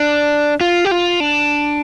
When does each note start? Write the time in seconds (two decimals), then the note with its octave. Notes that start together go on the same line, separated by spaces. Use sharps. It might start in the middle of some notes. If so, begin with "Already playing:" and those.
Already playing: D4
0.61 F4
0.85 G4
0.91 F4
1.20 D4